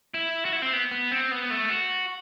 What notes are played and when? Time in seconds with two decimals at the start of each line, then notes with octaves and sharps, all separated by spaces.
0.14 E4
0.45 F#4
0.53 E4
0.62 C4
0.73 B3
0.91 B3
1.11 C4
1.31 B3
1.50 A3
1.70 F#4